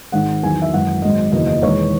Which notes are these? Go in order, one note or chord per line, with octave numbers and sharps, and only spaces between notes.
G#1 G#2 D#3 F#5
E2 D#3 F#3 G#5
E5
G#1 F#2 E3 F#5
G#1 G#2 F#3 D#5
F#1 E2 D#3 F#3 D#5
D#5
E1 E2 D#3 C#5